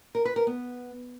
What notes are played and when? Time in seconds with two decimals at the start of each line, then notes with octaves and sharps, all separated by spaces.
0.15 A#4
0.25 B4
0.36 A#4
0.47 B3